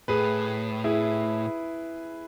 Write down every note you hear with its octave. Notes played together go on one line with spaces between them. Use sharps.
A2 G#4 B4
E4 G#4